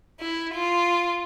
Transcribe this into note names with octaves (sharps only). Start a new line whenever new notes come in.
E4
F4